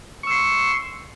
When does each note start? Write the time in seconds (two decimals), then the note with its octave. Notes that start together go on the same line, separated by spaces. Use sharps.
0.23 C#6
0.27 E6
0.31 C6